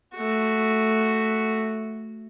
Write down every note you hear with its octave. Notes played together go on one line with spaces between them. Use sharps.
A3 F#4